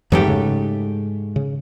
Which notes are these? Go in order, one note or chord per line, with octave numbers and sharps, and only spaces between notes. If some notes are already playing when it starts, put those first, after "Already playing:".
F2 G#2 E3 F#3 A3 G4
C#3
C#3